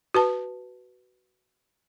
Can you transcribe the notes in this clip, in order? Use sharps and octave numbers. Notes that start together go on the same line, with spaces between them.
F#4 B4 A5